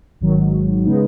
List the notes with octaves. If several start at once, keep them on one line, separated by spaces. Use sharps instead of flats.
G#1 G#2 D#3 F#3
C#3 G#3 B3 D#4